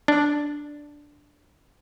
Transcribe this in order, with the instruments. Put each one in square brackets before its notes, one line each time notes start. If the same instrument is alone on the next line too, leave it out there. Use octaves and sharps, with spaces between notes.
[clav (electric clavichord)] D4